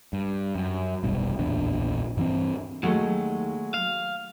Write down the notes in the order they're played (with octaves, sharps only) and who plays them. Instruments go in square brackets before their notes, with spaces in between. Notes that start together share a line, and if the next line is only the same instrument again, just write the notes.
[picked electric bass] G2
F#2
F1 B1 G2 B2
D1 A#1 E2 D4
G2 E3 C4
[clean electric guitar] D#2 [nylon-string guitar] F#3 G#3 A3
[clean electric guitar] F5